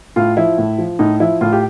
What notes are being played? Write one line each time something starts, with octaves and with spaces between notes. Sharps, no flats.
A2 F4
F3 E4
A2
F3
A2 D#4
F3 E4
A2 F4
G4